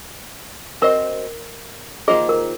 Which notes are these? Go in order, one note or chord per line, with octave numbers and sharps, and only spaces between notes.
C4 F#4 A#4 C5 D#5
D#3 A#3 F4 G#4 C5 D#5
A#4